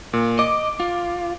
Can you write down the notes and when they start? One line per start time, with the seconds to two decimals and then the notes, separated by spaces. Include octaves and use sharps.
0.13 A#2
0.39 D#5 D6
0.80 F4